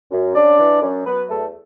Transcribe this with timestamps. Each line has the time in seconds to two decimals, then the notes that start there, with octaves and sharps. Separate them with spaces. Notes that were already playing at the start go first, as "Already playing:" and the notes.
0.11 F#2
0.35 C#3 D4 D5
0.59 E3
0.82 F#2
1.06 F#3 B3 B4
1.29 E2 A3 A4